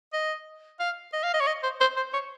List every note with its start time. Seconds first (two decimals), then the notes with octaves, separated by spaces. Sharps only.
0.13 D#5
0.80 F5
1.13 D#5
1.23 F5
1.34 D#5
1.40 C#5
1.47 D#5
1.63 C5
1.81 C5
1.96 C5
2.13 C#5